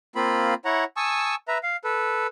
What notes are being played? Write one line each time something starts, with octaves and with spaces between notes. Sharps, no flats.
A#3 C4 F4 B5
E4 C#5 F#5 A#5
G#5 A5 C#6 D#6 E6
B4 E5 A#5
F5
A4 B4